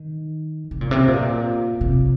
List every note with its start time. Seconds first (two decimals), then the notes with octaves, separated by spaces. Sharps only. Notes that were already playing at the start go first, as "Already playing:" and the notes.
Already playing: D#3
0.71 C3
0.81 A#2
0.91 C3
1.08 A#2
1.81 C3